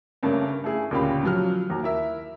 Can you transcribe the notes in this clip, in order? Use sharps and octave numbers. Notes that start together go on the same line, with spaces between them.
G2 C#3 A3 A#3 C#4
A3 E4 G#4
D2 A#2 C#3 G4 F5 B5
F3 F#3 F6
D#2 F#4 A#5
E4 A#4 E5